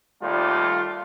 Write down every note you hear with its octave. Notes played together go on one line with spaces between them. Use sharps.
D#2 G3 A3 F4